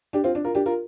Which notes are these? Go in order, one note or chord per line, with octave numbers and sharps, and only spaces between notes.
D4 G4
C4 F4
D4
F4 A#4
D4 G4
F4 A#4